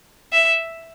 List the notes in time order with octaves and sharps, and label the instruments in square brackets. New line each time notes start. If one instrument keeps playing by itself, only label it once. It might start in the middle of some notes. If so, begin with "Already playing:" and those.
[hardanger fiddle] E5